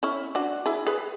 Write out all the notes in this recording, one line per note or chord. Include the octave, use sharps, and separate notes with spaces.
C#4 E4
D4 F#4
E4 G#4
G#4 B4